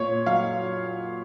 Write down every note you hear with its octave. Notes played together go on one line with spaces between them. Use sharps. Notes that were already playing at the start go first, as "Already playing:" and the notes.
Already playing: A#2 C#5
F#3 F5